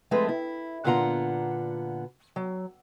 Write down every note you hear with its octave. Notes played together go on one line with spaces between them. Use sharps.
F3 G#3 A3 C4 F4 B4
E4
A#2 D3 B3 F4 F#5 A#5
F#3